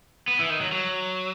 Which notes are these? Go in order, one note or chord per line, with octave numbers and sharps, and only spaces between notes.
B3
E3
D#3
F#3
F#3